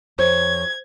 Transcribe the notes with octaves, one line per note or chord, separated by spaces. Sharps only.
F2 C5 C#5 G#6